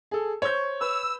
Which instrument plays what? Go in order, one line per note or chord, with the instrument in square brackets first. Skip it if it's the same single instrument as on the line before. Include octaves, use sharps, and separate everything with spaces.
[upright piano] G#4 A4
[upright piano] C5 C#6 G6 [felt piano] C#5
[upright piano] B4 [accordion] E6